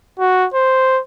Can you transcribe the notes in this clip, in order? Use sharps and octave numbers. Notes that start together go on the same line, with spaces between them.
F#4
C5